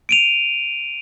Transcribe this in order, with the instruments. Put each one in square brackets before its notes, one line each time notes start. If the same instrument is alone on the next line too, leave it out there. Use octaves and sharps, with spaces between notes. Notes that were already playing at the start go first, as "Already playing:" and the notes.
[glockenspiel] D7 D#7 F7